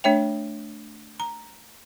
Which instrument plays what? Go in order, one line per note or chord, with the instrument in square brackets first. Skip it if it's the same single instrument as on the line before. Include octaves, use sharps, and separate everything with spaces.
[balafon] A3 D4 C#5 E5 G5
A#5